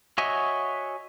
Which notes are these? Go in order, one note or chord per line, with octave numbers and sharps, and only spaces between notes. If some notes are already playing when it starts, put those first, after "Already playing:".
F#4 C#5 D#5 E5 G#5